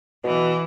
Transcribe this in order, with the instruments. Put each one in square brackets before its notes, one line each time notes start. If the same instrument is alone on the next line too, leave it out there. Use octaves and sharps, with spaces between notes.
[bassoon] B2 [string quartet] E3